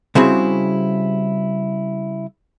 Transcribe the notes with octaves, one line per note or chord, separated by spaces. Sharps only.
C#3 G3 C4 E4 F#4 G#4